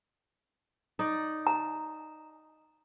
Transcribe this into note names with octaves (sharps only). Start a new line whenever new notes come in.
D#4 D5
A#5